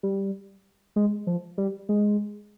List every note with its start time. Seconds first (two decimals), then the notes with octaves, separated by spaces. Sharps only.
0.03 G3
0.96 G#3
1.27 F3
1.58 G3
1.89 G#3